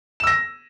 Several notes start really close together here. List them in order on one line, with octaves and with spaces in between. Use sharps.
E7 E6 A#6